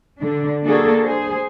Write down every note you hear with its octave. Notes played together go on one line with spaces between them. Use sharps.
D3 D4
A#3 D4 F#4 G#4 A4
G#4 C5